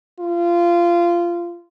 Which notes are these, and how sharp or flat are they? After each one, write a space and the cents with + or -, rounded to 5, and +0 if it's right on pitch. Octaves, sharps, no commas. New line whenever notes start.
F4 -20